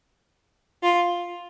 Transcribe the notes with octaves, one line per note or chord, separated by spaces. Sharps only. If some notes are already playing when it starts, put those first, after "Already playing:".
F4